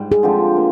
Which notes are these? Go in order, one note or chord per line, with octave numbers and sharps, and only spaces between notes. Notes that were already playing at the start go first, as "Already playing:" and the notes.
Already playing: G#2 G3
G#4
D3 F3 C4 G4
A#3